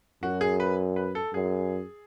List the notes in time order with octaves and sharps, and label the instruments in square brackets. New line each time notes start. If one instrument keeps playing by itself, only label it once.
[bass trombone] F#2 [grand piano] F#4
[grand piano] G#4
B4
B4
A4
[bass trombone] F#2 [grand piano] G#4